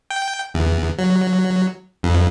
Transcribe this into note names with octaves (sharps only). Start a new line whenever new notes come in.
G5
E2
F#3
F2